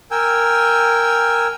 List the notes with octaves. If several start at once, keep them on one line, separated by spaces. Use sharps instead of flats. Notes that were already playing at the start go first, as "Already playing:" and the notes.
A#4 G5 G#5 E6